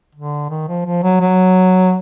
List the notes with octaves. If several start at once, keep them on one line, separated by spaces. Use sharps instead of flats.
D3
D#3
F3
F3
F#3
F#3